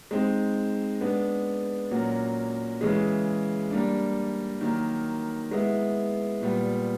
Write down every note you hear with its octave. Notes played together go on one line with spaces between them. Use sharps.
G#3 C4 D#4
G#3 B3 D4
A#2 F#3 A#3 C#4 F#4
C#3 E3 G#3
G3 A#3 D4
D#3 F#3 A#3
G#3 B3 E4
A#2 G3 B3